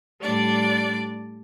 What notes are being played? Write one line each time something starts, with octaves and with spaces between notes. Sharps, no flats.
A2 G3 D4 D5